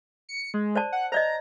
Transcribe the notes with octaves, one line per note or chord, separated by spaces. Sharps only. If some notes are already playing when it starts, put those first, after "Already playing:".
C#7
G#3
C5 D5 A5
F#5
C5 D5 D#5 A#5